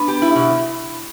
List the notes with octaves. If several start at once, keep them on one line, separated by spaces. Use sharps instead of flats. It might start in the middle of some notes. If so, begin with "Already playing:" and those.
Already playing: B3 D4
G4
E4
B2